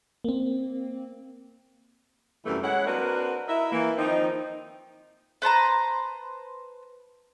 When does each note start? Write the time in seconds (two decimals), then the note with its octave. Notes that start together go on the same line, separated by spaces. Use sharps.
0.24 A#3 C4
2.46 F#2 C3 E3 G3 A3
2.63 G#3 E4 C#5 F#5
2.86 A#3 C4 D4 F#4 A#4 B4
3.48 E4 A#4 D#5 E5
3.71 E3 A#3
3.97 D#3 F3 C4 D#4
5.42 B4 C5 A5 A#5